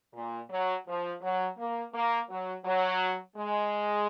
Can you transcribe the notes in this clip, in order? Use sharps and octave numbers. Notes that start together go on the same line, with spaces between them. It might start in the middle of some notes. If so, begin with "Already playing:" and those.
A#2
F#3
F3
F#3
A#3
A#3
F#3
F#3
G#3